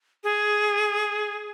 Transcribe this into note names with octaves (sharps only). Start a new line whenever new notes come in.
G#4